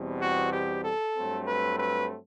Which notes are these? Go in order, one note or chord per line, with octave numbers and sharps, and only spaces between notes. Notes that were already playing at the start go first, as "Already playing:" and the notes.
Already playing: E2 B2 G3 C4
F#4
G4
A4
G2 F#3 A3 C4
B4
B4